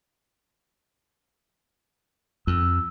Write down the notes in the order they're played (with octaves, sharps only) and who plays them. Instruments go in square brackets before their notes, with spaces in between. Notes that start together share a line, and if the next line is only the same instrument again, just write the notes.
[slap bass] F2 [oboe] E6